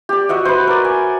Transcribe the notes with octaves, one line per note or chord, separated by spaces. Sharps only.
G4 D5
F#4 D#5 E5 F#5
B4 C5
A#4 D5
G#5